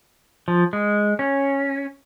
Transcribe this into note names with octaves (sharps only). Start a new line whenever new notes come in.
F3
G#3
C#4